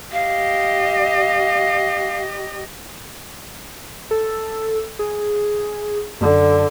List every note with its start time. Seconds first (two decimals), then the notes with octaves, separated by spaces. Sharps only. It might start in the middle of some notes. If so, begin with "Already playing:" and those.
0.13 G4 D#5 F5
4.11 A4
4.99 G#4
6.21 F#2 D3